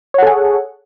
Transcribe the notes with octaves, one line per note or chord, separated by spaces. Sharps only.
G#4 A4 C#5 F#5